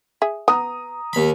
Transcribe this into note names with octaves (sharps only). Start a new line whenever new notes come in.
G#4 E5
B3 A#5 D#6
D#2 B5